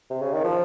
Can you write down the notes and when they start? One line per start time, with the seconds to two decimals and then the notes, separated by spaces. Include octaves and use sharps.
0.10 C3
0.22 C#3
0.33 D#3
0.44 F3